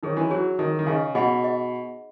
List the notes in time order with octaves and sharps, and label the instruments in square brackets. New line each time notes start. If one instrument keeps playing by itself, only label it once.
[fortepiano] D#3 [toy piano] D#4 G#4 C#5
[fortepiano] E3
[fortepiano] F#3 [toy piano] D#4 G#4 C#5
[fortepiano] D#3 [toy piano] D#4 G#4 D#5
[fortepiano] D#3
[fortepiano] C#3 [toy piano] D#4 G#4 D#5
[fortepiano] B2 [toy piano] G#4 D#5 F#5 B5
[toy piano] G#4 D#5